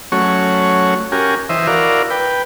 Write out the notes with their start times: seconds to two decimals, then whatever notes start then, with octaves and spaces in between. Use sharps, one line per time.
0.12 F#3 A3 C#4 F#4 C#5
1.12 C#4 F#4 G4 A#4 G#5
1.49 E3 C5 D#5 E5
1.67 E4 F#4 A#4 D5 F5
2.11 B4 G5